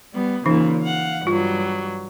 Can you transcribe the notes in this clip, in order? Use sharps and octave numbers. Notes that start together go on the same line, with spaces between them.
G3 B3
A#2 C#3 E3 D#4
F5 F#5
G2 F#3 F4